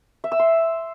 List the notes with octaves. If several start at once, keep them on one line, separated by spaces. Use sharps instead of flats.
E5
E6
C6